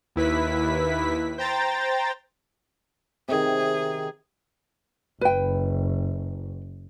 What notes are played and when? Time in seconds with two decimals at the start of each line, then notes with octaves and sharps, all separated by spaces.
0.16 D#2 E4 B4 B6
1.38 C5 G5 A#5 A6
3.29 C3 D#3 G#4
5.21 F#1 B4 G5